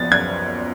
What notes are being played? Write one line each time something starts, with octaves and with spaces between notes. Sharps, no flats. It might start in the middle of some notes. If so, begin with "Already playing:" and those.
Already playing: F#2 F3 B3 A6
F#2 G#6